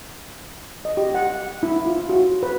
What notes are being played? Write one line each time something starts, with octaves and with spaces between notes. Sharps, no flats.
D#5
G4
F#5
E4
F4
F#4
B4